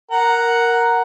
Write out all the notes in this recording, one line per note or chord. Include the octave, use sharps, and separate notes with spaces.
A#4 F#5